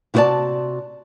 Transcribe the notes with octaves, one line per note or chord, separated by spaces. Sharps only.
C3 E4 F#4 C5 D5 A5